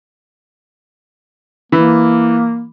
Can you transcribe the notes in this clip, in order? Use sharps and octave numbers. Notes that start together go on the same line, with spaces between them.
E3 A#3